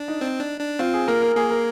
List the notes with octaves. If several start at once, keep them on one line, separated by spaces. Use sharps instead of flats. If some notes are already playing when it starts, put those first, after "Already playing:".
Already playing: D4
D#4
C4
D4
D4
C4 F4
G#4
A#3 A#4
A#4
A#3 G#4
A#4